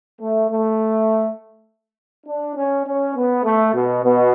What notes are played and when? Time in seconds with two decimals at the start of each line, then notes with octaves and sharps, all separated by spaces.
0.21 A3
0.50 A3
2.27 D4
2.56 C#4
2.85 C#4
3.15 B3
3.44 A3
3.73 B2
4.04 B2